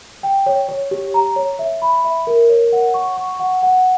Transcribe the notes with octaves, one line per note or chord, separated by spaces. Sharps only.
G5
C#5
C#5
G4
A#5
C#5
E5
B5
E5
A#4
C#5
F#5
C#6
C#6
F#5
F#5